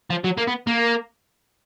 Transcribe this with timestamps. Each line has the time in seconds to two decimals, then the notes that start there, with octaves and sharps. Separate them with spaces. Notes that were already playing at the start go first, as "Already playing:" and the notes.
0.10 F3
0.24 F#3
0.37 A#3
0.47 B3
0.67 A#3